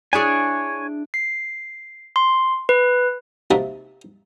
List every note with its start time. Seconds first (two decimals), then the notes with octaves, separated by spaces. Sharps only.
0.13 D4 E4 G#4 C#5 G#5
1.14 C7
2.16 C6
2.69 B4
3.51 C3 A#3 D#4 F#4 E5 A5